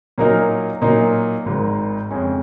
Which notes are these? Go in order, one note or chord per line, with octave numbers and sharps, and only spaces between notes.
A#2 F#3 A#3 D#4 A#4
A#2 F#3 A#3 D#4
G#1 G#2 D#3
F2 C#3 G#3 C#4